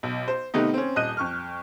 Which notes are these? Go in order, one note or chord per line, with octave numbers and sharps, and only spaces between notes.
B1
C5
C3 D#3 A3 B3 D#4
C4 C#4
D#1 D#5 F#6 D#7
F2 C#6 F6